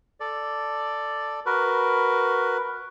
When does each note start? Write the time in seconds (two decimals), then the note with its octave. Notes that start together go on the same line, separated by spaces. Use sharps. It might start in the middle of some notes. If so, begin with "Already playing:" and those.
0.20 A4 D5
1.46 F#4 A#4 B4